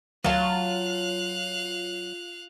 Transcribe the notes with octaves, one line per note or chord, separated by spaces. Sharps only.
D2 D#3 F#3 F4 F5 A5 F#6